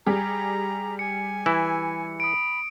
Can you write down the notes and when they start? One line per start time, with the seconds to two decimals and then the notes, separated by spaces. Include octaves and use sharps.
0.06 G3 G4 G#4 A#5
0.99 G#5 C#7
1.46 E3 E4
2.20 B5 D#6 D7